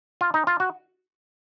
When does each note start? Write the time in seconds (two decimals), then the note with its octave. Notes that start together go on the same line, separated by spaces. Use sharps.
0.21 F4
0.34 D#4
0.47 F4
0.60 F#4